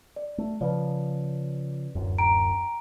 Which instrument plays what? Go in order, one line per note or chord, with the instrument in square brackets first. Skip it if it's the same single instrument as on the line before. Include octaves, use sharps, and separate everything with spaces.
[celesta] D5
[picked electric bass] A3
[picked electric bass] C#3 F3 [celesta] B4 D5
[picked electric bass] D1 G1 F#2
[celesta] G5 A#5 D7